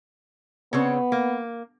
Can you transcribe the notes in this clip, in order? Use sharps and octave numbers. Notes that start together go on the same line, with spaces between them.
C#3 B3 C4 C#5
A#3